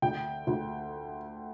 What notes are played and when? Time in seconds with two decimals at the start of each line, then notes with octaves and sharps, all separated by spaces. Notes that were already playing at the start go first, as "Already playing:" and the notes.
0.02 D2 G5
0.47 D2